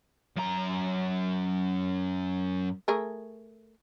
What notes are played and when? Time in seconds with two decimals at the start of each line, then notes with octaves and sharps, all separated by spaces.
0.37 F#2 A#5
2.88 A3 G#4 A#4